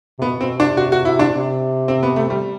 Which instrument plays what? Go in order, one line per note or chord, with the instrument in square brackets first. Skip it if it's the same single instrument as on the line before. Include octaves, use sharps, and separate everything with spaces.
[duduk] C3
[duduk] B2 [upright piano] B3
[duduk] B2 [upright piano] C4
[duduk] C3 [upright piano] D4
[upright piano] F#4
F#4
E4
D4
[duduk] C3
[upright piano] C4
B3
A3
G3